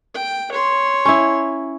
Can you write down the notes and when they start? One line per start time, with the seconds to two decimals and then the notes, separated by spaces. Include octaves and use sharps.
0.14 G5
0.52 C#5 C6
1.05 C#4 E4